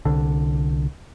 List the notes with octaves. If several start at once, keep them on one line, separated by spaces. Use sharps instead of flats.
C2 D3